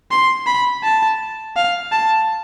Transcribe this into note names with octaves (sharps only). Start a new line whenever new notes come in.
C6
B5
A5
F5
A5